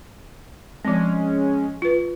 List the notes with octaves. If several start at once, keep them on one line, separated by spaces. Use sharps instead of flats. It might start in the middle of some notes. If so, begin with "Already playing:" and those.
F3 G#3 C4 C#4
F4 B4